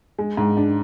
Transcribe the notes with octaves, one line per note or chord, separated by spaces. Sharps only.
G#3
G#2
D4